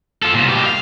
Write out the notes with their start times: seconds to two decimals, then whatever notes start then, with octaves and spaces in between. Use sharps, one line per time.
0.22 F4 A4
0.34 C2 A#2
0.47 B2 G4
0.66 F5